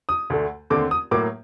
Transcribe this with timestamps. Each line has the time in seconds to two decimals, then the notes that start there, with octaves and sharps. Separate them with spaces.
0.09 D#6
0.30 D2 D3 A3
0.70 D#2 D3 A3 C4 D6
0.91 D#6
1.11 A2 F#3 A#3 D6